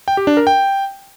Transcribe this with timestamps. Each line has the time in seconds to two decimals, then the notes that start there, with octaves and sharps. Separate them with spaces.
0.08 G5
0.17 G4
0.27 D4
0.37 A#4
0.47 G5